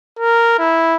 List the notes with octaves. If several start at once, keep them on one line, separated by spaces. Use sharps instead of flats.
A#4
E4